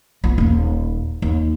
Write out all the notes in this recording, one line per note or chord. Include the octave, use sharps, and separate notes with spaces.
B3 F4
D#1 A#3
D#2